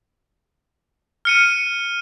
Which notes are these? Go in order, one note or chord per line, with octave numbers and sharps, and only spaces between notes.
F6 C#7 D#7